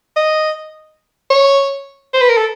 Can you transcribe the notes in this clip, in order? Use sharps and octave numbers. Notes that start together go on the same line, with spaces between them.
D#5
C#5
C5
B4
A#4
A4